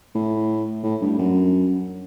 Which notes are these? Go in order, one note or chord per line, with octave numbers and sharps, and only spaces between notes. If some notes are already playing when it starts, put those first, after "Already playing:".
A2
A2
G2
F#2